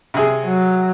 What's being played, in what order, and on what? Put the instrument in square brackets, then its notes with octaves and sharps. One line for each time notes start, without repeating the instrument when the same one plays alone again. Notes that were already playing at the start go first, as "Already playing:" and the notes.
[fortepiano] C3 G#4
[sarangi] F#3